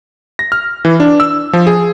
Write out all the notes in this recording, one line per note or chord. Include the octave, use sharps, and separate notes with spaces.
A#6
F6
E3
D4
E6
F3
G#4